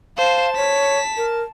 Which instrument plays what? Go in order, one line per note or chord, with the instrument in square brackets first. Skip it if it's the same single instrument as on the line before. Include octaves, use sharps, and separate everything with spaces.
[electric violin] C5 [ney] F5 [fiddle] A5
[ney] C#5 [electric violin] B6
[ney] A#4